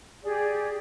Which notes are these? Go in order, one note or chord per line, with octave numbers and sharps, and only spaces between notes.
G4 G#4 D5